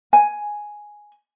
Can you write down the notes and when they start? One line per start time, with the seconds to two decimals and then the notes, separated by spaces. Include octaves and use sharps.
0.13 G#5